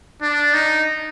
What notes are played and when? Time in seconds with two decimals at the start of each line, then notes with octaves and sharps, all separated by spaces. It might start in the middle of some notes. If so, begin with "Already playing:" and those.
0.22 D4
0.53 D#4